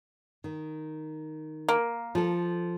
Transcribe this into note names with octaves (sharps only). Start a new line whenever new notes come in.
D#3
A#3
F3 A4